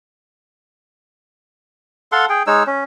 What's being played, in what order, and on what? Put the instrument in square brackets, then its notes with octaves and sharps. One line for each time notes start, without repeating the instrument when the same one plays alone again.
[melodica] A4 F5 F#5 C6
G#4 G5
G#3 D#4 C#5 E6
C#4